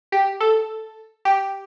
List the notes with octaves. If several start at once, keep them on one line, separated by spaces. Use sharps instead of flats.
G4
A4
G4